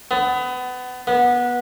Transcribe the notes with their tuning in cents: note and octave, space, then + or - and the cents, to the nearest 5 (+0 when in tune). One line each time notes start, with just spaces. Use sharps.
B3 +25
B3 -20